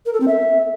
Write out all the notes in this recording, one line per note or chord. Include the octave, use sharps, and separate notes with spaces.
A#4
A4
C4
E5